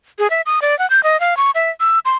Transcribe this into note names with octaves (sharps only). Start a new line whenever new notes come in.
G#4
E5
D#6
D5
F#5
G6
D#5
F5
C#6
E5
E6
C6